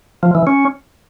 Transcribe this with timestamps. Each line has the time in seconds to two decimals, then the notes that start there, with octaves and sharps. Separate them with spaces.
0.23 F3
0.35 E3
0.47 C#4